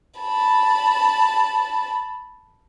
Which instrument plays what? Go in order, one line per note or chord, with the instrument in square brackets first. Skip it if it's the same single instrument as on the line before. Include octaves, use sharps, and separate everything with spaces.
[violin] A5 B5